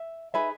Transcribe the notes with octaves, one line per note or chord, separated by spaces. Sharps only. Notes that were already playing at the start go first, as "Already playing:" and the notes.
Already playing: E5
D#4 G#4 B4 E5